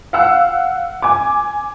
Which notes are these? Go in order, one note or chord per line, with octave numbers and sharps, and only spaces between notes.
F5 F#5 E6
G#5 D6